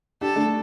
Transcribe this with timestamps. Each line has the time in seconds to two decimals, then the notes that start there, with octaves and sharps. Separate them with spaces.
0.21 D4 G4 A4
0.36 A3 D4